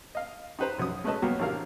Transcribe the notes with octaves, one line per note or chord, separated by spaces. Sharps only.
D#5 F5
D#4 G4 B4 C5 A#5
B1 F#2 C#4 D#6
G#3 A3 C#4 B4 D#5 A5
F#3 G3 A#3 B3 G4
A1 C3 D4 A#4 F5